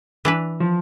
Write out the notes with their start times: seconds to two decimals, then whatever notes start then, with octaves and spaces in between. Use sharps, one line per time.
0.25 E3 D4 B4
0.60 F3